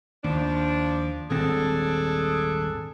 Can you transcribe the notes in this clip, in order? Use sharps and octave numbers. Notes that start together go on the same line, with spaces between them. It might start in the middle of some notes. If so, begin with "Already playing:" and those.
D#2 F3 D4
D#1 G#1 C4 D4 G#4 A4